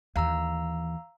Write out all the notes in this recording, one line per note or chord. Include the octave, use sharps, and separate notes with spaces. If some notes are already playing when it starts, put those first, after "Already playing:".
D#2 E3 F5 A#5 E6